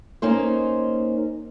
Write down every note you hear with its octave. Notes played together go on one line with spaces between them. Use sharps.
A#3 C#4 D#4 C5